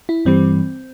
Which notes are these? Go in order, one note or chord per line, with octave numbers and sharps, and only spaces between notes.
E4
G2 E3 G3 C4